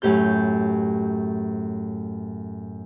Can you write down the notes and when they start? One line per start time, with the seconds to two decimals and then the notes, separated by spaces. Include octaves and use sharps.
0.02 F#2 A2 G4 G6